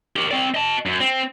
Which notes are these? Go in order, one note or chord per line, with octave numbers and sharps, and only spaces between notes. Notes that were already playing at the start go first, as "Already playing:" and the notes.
G4 A#4
C4 D5
D#5 A5
F#2
C4